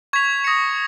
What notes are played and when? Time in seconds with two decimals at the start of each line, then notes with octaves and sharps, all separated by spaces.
0.13 C#6 G#6 B6 F7
0.44 D#6 A#6 C#7